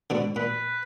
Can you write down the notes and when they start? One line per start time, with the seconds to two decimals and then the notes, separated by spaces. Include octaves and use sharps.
0.10 G#2 B2 D3
0.36 A#2 B4